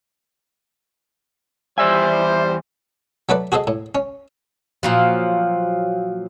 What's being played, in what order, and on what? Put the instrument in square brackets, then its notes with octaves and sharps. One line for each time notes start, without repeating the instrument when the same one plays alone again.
[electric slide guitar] E2 D5 G#5 [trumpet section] G3 C5 [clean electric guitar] E5
[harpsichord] F#3 A3 B4 D5
F#4 G#4 A4 C5 D#5
A2
C#4
[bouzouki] A#2 F3 F#3